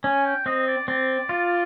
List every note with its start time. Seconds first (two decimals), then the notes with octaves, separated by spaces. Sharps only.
0.04 C#4 G#5
0.25 G5
0.46 C4 D#5
0.67 D5
0.88 C4 D5
1.29 F4